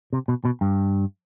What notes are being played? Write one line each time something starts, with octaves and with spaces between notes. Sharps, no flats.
C3
B2
B2
G2